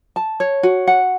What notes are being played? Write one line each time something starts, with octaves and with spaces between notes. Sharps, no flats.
A5
C#5
F#4
F#5